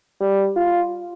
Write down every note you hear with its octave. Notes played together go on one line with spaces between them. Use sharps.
G3
F4